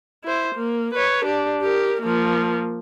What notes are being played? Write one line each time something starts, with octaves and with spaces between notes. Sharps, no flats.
E4 C5
A#3
B4 C#5
D4 G4
G4 A#4
F3 A#3